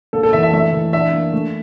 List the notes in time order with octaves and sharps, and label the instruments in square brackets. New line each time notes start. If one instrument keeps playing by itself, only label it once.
[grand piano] A#3 [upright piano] A4
[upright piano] A4
[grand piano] E3 [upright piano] E5
[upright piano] E5
[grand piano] A3 [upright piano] E5
[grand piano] E3
[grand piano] D4 [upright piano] E5
[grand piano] A#3
A3